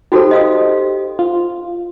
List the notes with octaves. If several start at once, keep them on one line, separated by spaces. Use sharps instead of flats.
D#4 F#4 G4 A4 C5
D#5 F5 D#6
F4